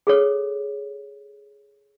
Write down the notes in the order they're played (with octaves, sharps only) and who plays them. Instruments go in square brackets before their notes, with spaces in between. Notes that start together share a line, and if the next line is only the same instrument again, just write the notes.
[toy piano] G#4 A4 C#5